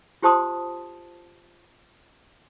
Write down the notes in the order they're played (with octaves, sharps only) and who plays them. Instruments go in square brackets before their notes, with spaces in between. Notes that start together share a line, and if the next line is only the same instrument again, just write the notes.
[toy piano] F4 G4 C5 A5 C6 D#6